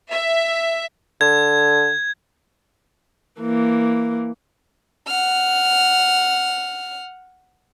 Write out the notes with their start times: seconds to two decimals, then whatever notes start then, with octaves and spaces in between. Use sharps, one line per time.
0.10 E5
1.21 D3 G#6
3.41 E3 A#3
5.08 F#5 F6